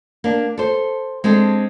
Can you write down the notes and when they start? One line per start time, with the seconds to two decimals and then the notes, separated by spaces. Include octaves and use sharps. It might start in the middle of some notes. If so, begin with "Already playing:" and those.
0.24 A#3 D4
0.58 A4 C5
1.24 G#3 C4 D4 A4